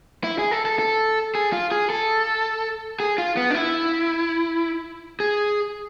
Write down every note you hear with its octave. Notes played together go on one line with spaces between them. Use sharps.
E4
G#4
A4
A4
A4
G#4
F4
G#4
A4
G#4
F4
B3
D4
E4
G#4